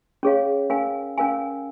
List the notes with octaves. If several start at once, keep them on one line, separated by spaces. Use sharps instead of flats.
C#4 G#4 C#5 F5
C#4 A#4 F5 G#5
C#4 A#4 F5 G#5